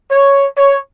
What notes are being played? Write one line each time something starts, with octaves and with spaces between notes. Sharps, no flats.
C#5
C#5